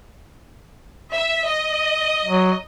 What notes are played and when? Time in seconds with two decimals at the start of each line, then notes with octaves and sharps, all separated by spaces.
1.13 E5
1.48 D#5
2.25 F#3